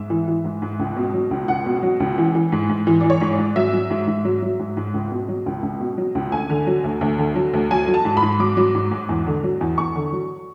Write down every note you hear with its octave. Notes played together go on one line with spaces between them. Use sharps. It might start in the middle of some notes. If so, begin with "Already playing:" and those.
Already playing: G#2 E5
E3
E3
G#2
G#2
C#2
B2
F#3
C#2
C#2 F#5
B2
F#3
C#2
E3
E3
G#2
G#2
E3
E3 D5
C#5
G#2
D5
G#2
F#3 E5
F#3
G#2
G#2
F#3
F#3
G#2
G#2
C#2
B2
F#3
C#2
C#2
B2
F#3
C#2
D2 G#5
D3
F#3
D2
D2
D3
F#3
D2
F#3 G#5
F#3
A5
G#2
B5
G#2
F#3 D6
F#3
G#2
G#2
E2
D3
F#3
E2
E2 C#6
D3
F#3